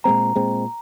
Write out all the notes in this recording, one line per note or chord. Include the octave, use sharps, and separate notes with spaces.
A#2 G#3 C4 A#5
A#2 G#3 C4